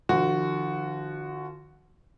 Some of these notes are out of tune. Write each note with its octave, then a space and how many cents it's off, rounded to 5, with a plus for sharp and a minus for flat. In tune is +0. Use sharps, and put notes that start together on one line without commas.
D3 +35 F3 -25 F#4 +0